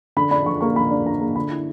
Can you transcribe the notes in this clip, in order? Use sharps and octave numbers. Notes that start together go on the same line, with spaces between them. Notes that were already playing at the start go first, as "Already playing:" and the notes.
D3 B5
D4 B5
D3 C#6
A#3 C#6
D3 B5
D4
D3 A#5
A#3
D3 B5
E4